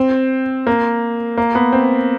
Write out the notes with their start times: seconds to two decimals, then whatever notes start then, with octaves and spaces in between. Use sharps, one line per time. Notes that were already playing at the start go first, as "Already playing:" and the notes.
Already playing: C4
0.67 A#3
1.38 A#3
1.55 B3
1.72 C4